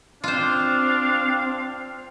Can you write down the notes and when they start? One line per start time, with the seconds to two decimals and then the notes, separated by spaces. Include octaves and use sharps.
0.24 C4 D4 F4 C5 F5